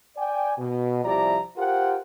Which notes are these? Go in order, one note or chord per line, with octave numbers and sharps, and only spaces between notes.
D5 G5 G#5
B2
C2 F3 E4 G4 D5 A#5
F4 G4 A#4 C5 F#5 G5